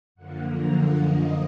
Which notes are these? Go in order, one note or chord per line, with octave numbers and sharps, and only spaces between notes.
F#2 D3 F3 A#3 F#5
A#5
F#5
D#5